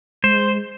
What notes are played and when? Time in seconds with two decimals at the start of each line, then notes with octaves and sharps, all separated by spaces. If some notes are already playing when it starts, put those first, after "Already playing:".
0.23 G#3 C5